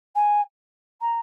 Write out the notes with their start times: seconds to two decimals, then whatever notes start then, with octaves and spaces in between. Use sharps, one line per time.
0.15 G#5
1.01 A#5